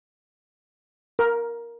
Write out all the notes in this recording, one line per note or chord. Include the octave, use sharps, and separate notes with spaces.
A#4